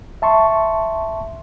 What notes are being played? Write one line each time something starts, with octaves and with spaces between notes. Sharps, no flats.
E5 A5 C6 C#6